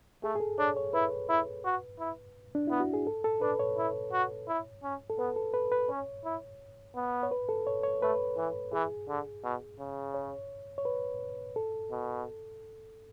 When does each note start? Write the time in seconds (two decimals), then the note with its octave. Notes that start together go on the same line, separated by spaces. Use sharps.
0.23 A3 G#4
0.35 G#4
0.40 A4
0.58 D4 C#5
0.77 C#5
0.94 E4 B4
1.29 E4
1.65 F#4
2.00 E4
2.55 D4
2.67 B3 E4
2.80 F#4
2.94 G#4
3.07 A4
3.24 A4
3.41 D4 B4
3.59 C#5
3.77 E4
4.12 F#4
4.48 E4
4.83 C#4
5.10 A4
5.19 B3 B4
5.36 A4
5.54 B4
5.72 B4
5.89 C#4 C#5
6.25 E4
6.95 B3
7.23 C#5
7.31 B4
7.49 A4
7.67 C#5
7.84 C#5
8.02 A3 B4
8.37 E3
8.73 E3 G#4
9.08 D3
9.43 B2
9.79 C#3
10.14 C#5
10.78 C#5
10.85 B4
11.56 A4
11.91 B2